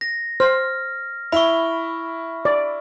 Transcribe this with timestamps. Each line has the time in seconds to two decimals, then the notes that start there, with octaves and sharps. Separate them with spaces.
0.01 A#6
0.40 C5 F6
1.32 E4 E5 B5 C#6
2.45 D5